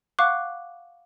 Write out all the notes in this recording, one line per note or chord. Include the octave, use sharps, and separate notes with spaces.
F5 F#5 C#6 D6 F#6